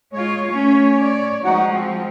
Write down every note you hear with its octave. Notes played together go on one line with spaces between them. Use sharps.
G#3 F4 C#5
A3 C#4
D5
F3 G#3 D#4 F#4 F#5
C4